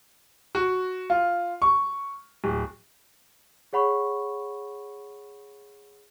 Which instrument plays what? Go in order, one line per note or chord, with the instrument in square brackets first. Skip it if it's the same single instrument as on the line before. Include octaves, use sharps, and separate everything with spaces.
[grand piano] F#4
F4
C#6
D1
[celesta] G#4 C#5 F#5 B5 C#6